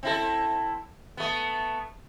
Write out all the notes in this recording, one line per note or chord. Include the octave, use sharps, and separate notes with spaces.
C4 E4 A4
A3 B3